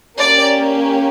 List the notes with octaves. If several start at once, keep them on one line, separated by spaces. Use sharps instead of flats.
A#3 C#4 G4 D5